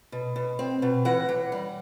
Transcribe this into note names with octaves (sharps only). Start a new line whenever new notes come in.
B2
B2
C4
B2
E3 F#5
E3
G3